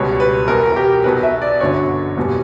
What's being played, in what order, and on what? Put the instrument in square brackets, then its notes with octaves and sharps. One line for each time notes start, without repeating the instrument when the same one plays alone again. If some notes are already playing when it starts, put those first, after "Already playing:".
Already playing: [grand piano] C#2 B2 G3 C#5
B4
E2 B2 F#3 A#4
A#4
G4
B1 B2 F#3 B4
E5
D5
G1 F#2 D3 F#3 C#5
F#1 E2 B2 G3